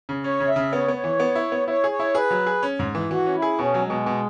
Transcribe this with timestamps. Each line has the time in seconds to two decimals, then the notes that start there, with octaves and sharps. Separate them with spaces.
0.09 C#3
0.24 C#4 C#5
0.40 C#3
0.48 E5
0.56 C#3
0.72 B3 C#5
0.88 B3
0.96 C#5
1.04 E3
1.20 B3
1.35 E4
1.52 B3
1.68 E4 C#5
1.84 G#4
1.91 C#5
1.99 E4
2.15 G#4 B4
2.31 F#3
2.46 G#4
2.63 C#4
2.79 G#2
2.95 E3
3.11 E3 F#4
3.26 C#4
3.35 E4
3.42 G#4
3.59 B2 C#4
3.74 F#3
3.82 G#3
3.90 B2
4.06 B2